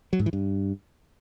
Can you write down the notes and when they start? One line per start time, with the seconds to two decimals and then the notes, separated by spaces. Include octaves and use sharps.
0.13 F#3
0.19 G#2
0.26 E3
0.33 G2